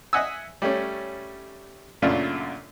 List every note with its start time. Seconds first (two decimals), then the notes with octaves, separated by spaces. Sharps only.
0.13 D#5 E5 F#5 G#5 E6
0.62 G3 A3 C#4
2.02 F#2 A#2 C#3 A3 D4 F4